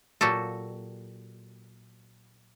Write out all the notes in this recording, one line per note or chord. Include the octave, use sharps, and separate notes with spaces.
A#2 F#3 F#4 G4 A4